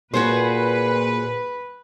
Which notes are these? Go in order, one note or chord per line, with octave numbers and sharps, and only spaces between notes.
A#2 F#4 G#4 B4 C5